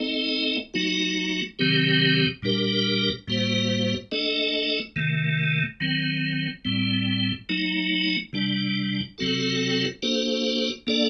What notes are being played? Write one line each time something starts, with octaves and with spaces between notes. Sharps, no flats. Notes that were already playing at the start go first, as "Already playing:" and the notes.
Already playing: A3 C4 D#4 A4 D#5
F#3 A3 D#4 F#4
C3 D#3 F#3 C4 G4
A#2 G3 D4 G4 A#4
A2 G3 A#3 F#4 C5
A3 D4 A4 D#5
C3 D#3 A3
D#3 F#3 C4
A2 G3 C4
F#3 A3 D#4
C3 G3 D4
C3 F#3 C4 F#4 A4
A#3 D4 F#4 A4 C5
A#3 D4 A4 D5